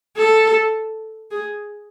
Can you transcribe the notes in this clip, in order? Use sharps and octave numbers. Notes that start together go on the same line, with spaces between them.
A4
G#4